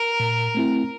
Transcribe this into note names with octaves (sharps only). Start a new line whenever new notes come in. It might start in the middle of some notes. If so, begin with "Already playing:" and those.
Already playing: A#4
A#2
A3 C4 E4